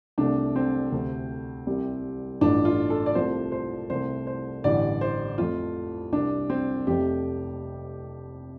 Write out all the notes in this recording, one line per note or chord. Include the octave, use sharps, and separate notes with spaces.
C2 C3 A3 D4
C4
D2 C3 A3
C2 C3 G3
A1 G2 F3 A3 D4
F4
A4
D5
C2 C3 F3 A3 C5
C5
C2 C3 A3 C5
C5
A1 G2 D3 G3 D5
C5
F2 F3 A3 F4
C2 C3 G3 D4
C4
F1 F2 C3 A3 G4